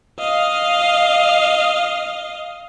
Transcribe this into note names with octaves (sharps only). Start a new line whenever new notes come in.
D#5 F5